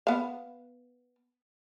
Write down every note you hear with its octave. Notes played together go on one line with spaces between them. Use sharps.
B3 F5